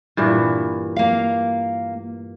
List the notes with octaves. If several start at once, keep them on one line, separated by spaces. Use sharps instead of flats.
G2 A#2 E3
A#3 F5